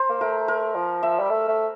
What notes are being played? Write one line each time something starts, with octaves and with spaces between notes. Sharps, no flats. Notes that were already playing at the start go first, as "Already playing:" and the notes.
Already playing: C5 A#5 C6
A#3
A3 A#4
A#4
F3
E5
G3
A3
A3